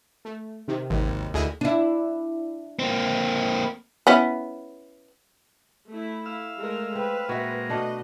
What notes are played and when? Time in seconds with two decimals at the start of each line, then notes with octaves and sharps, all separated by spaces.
0.25 A3
0.68 C3 D#3
0.90 G#1 D#2
1.34 D2 E4 G#4 D#5
1.61 D4 E4
2.79 A#3 C4
4.07 B3 C#4 E4
5.88 A3 E4
6.26 F5 E6
6.59 G#3 A3 A#4
6.95 C4 B4
7.29 A#2 G#3 A#3 F#4 E5
7.69 B2 A3 D4 D#5 F#5